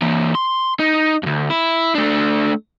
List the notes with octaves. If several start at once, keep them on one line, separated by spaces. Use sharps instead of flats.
E3 A#3
C6
D#4
D2 G2
E4
A3 D4